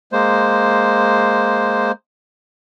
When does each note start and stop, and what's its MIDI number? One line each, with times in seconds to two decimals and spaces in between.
0.12 1.92 56
0.12 1.92 58
0.12 1.92 72